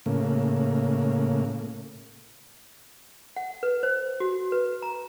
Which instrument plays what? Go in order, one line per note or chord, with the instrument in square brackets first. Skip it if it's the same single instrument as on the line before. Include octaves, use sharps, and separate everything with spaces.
[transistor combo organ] A2 C#3 A#3
[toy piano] F#5
B4
C5
F#4
B4
A#5